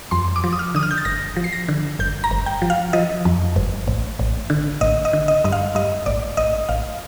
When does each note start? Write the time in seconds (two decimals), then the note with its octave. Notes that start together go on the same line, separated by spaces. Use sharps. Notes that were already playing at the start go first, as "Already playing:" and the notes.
0.11 F2 C6
0.36 D6
0.44 F3
0.53 D#6
0.59 F6
0.75 D3 D#6
0.83 F6
0.91 G6
0.98 A6
1.05 G1 A#6
1.36 F3
1.44 C7
1.52 A#6
1.68 D3
1.99 G1 G6
2.24 A#5
2.31 G1
2.46 G5
2.62 F3
2.70 F5
2.93 F3 D#5
3.25 F2
3.56 G1
3.88 A1
4.19 A1
4.50 D3
4.81 A1 D#5
5.05 D#5
5.13 D3
5.28 D#5
5.44 G2 D#5
5.52 F5
5.75 G2 D#5
6.06 A1 D5
6.37 A1 D#5
6.69 A1 F5